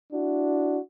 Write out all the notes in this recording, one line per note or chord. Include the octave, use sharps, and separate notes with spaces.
D4 E4 F#4